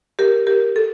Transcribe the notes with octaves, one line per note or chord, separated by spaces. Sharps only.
G4 A#4
G4 A#4
A4